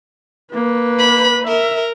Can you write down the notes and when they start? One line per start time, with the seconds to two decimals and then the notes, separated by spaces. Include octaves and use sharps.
0.53 A#3 B4
0.99 B5
1.47 A#4 E5